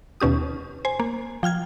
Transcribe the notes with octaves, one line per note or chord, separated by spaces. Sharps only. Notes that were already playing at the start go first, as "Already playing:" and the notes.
D#2 B2 C#4 G4 D#6
C5 G#5
A#3
F3 G5 F6 G#6